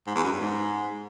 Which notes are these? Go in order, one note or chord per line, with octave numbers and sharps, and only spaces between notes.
G#2
E2
F#2
G2
G#2